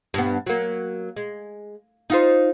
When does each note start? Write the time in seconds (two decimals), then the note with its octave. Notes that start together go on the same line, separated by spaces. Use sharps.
0.14 G2 B3
0.46 F#3 A#3
1.16 G#3
2.10 D#4 F4 C5